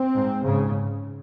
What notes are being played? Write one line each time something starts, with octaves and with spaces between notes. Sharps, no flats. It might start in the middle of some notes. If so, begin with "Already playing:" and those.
Already playing: C4
G#2
G#2 C#3